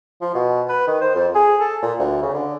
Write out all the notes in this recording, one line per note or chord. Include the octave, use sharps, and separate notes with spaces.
F3
B2
B4
D#3
C5
F2
G#4
A4
A#2
D2
C#3
D3